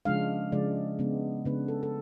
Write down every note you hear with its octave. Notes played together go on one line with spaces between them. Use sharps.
C#3 F3 G#3 D4 F5
C#3 F3 G#3 D4 D5
C#3 G#3 B3 D4
C#3 G#3 B3 D4 B4
A4
A4